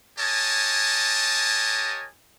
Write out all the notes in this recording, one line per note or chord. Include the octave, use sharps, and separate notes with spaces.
G4 A#4 C#5 D#5 G#5 A5